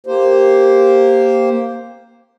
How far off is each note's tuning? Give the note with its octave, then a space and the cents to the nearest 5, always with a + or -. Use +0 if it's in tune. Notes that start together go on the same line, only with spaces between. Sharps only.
A#3 +0 G4 +0 C5 +0